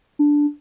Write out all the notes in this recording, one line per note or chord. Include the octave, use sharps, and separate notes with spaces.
D4